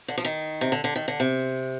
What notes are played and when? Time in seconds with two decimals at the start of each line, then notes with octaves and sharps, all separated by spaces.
0.08 D3
0.17 F3
0.25 D#3
0.61 C3
0.72 D3
0.84 D3
0.96 D#3
1.08 D3
1.20 C3